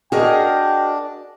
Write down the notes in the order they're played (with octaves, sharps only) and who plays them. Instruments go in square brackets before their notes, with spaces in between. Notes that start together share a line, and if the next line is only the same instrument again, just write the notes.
[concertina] D4 [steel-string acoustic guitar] F#4 A#4 D#5 [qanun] G#4 [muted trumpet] G5